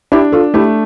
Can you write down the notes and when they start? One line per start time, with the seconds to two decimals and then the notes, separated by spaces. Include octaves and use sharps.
0.12 D4 E4 G4
0.32 F4 A4
0.54 A3 E4 G4